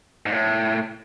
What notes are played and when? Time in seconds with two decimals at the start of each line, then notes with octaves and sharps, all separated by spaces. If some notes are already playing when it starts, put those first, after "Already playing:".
0.26 G#2
0.32 A2